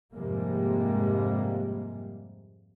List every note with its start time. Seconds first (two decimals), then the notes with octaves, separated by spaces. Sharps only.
0.15 F2 G#2 C3 G3 G#3 A#3